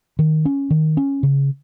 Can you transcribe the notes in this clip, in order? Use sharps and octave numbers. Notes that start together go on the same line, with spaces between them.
D#3
C#4
D#3
C#4
C#3